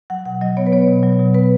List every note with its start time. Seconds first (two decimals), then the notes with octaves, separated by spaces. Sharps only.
0.10 F#3 F#5
0.25 B2 F#5
0.41 F#3 D#5
0.57 B3 C#5
0.67 B4
0.72 B3 C#5
0.88 B2
1.03 F#3
1.19 B2
1.34 B3 B4